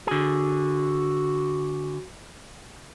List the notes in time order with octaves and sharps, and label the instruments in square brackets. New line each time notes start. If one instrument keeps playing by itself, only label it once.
[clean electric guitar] D3 G#4 [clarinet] F#4